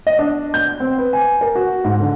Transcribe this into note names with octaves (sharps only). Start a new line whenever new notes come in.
D#5
D4
G6
C4
B4
G#5
A#4
F#4
G#2
D3